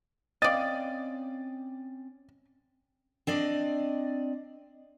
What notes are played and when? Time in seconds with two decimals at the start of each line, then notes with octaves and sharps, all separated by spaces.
0.42 C4 C#4 D5 D#5 F5 A6
3.27 C4 D4 D5 D#5